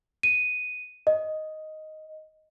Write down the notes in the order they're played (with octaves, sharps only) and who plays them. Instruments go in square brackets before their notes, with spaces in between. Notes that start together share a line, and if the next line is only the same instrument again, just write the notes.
[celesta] D#7
D#5